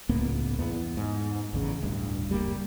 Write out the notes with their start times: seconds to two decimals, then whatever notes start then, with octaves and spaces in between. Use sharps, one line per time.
0.09 C#2 A2 A#3 B3
0.59 E2 B3
0.97 G#2
1.53 A1 E2 C#3
1.82 D1 G2
2.29 F#1 G3 A#3